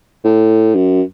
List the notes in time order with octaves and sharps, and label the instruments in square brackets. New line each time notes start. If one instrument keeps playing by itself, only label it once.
[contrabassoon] A2
F#2